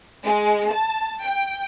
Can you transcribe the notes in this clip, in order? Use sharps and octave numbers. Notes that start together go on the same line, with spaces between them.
G#3
A5
G5